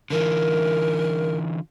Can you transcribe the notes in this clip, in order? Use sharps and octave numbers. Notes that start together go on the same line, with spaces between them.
D3 E3 F4 A#4